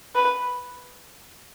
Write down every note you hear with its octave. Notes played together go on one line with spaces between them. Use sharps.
B4